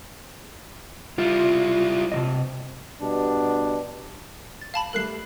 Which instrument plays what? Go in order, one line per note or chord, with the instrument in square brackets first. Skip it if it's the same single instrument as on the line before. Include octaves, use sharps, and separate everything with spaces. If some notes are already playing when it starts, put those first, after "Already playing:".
[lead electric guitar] G3 E4 [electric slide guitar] F4
[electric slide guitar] C3 E3 D#5
[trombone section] B2 G3 D4
[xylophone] A6
F5 A5 B5
[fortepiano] G3 A3 A#4 [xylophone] A4 F#6 C7